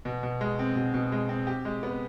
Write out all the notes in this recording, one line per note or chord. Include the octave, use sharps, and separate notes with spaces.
B2
B2
G#3
C4
B2
B2
G#3
C4
G4
G#3
B3